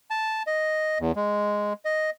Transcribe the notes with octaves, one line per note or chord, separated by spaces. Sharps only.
A5
D#5
E2
G#3
D#5